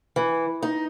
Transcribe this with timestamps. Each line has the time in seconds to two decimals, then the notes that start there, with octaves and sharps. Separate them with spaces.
0.16 E3
0.62 D#4